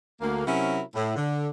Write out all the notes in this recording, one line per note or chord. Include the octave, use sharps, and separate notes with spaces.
D2 A#3
C3 F#3 C#4 E4 F#4 A#4
A2
D3